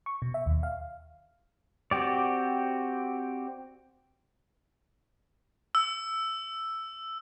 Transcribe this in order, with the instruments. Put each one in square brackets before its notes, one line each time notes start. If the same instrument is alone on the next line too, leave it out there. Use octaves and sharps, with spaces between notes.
[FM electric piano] C#6
B2
E5
D#2
F5
[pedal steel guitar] C4 F#4 G4 D5
[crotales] E6